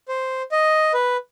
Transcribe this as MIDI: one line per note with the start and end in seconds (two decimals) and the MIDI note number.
0.08 0.42 72
0.52 0.92 75
0.94 1.17 71